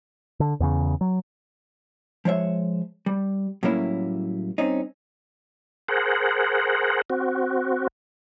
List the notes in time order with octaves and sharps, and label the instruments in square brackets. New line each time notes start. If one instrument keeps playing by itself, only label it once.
[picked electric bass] D3
E2 C#3
F#3
[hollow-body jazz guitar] F3 G#3 C#5 E5
G3
A2 F#3 G3 A#3 C#4 E4
G2 C4 C#4 D#4
[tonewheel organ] G#4 A#4 C5 F#5
C4 F#4